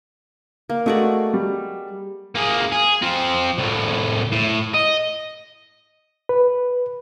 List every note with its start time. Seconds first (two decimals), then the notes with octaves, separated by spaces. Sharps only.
0.69 A#3
0.86 G#3 A3 F#4 D5
1.34 G3
2.35 A#3 G#4
2.72 G#4
3.02 F3 C4
3.58 C2 A2
4.32 A2
4.74 D#5
6.29 B4